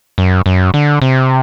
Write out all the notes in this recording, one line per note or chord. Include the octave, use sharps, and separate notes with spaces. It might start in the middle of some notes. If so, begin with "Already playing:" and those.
F#2
F#2
D3
C3